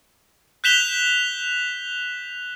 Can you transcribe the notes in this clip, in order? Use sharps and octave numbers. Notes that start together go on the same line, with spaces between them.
F#6 G6 B6 E7 F7 G7